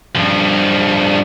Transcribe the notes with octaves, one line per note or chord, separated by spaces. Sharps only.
G2 F3